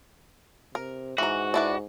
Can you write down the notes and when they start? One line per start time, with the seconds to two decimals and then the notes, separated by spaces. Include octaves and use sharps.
0.75 C3 A#4
1.18 G#2 E3 F#4 A#5
1.54 D4 E4 B4